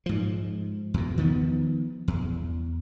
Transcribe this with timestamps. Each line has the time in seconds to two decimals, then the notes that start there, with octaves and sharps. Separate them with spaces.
0.06 G#2 F3
0.94 E2 B2
1.18 D#3 F3 B3
2.08 E2